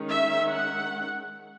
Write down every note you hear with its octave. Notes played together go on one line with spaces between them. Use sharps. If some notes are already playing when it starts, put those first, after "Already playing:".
Already playing: D#3 G#3 C#4
E5
F#5